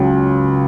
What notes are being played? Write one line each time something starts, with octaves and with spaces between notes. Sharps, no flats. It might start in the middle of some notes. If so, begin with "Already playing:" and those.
Already playing: C#2 C#3 F#3